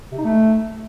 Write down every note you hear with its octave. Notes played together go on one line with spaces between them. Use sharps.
C3
D#4
A3